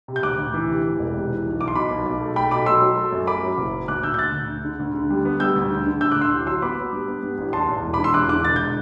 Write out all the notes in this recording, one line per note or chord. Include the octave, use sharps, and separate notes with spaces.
C3
G6
D2 D6 F#6
D2
E3
C3
E3
E1
C3
E3
B1
B1 D6
C6
B2 B5 D6
B1
B1
A3
A3 G5 B5
B2 B5 D6
F#3 C6 E6
F#3
A3
F#2
F#2 B5 D6
F#3
F#1
F#3
D2 D6 F#6
D2 E6 G6
G6
D2 F#6 A6
D2
D3
D3
D2
D3
G3
B3
G3 E6 G6
D2
D3
D3
D2 E6 G6
D6 F#6
D2
C6 E6
A1
F#3 C6 E6
B3 B5 D6
B3
G2
B3
G2
A1
E2 A5 C6
E2
E1
B5 D6
D3
C6 E6
E2 D6 F#6
D3 D6 F#6
E1 A6
G6